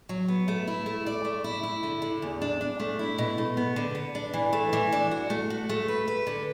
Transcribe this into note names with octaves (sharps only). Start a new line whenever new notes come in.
F#3
B3
A3
E4
A3
D5
A3
E4
E4
D3
D3
E2
D4
D4
A3
E4
B2
A3
B3
D3
B3
D4
E3
A3
E3
D4
F#4
A3
F#4
A3
B4
B4
D3